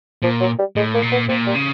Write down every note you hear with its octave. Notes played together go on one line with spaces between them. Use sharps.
A#2 F3
F#3
G3
A2 G#3
A#3
A#2
B3
A#2 C4
G3
C#3